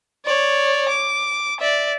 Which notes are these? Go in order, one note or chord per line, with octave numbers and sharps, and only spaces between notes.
C#5 D5
D6
D5 E5